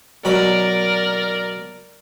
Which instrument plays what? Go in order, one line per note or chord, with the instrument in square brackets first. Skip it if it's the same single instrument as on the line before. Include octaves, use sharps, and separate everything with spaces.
[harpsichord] B2 F#3 B5 [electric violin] A#4 D5